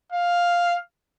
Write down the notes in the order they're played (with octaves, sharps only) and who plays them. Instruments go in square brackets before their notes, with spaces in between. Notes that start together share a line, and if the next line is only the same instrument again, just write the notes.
[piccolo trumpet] F5